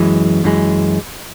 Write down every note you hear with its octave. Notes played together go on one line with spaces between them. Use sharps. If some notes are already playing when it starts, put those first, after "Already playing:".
Already playing: F#2 E3 G#3
F#2 E3 G#3